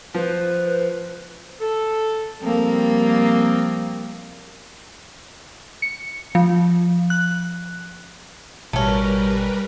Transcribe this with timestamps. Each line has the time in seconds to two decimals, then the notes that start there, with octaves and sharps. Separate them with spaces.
0.14 F3 B4 C5
1.60 A4
2.42 F3 G3 A#3 C4
5.82 C#7
6.35 F3
7.10 F#6
8.73 A1 B2 G3 A3 C#4 A#4 B4